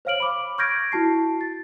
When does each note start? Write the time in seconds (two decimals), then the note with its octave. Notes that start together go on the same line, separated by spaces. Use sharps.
0.05 C5 C#5 F5 F6 D7 F#7
0.20 B5 D6
0.58 C#6 F6 G6 G#6 A#6 D7
0.92 E4 F#4 A5 C7
1.41 A6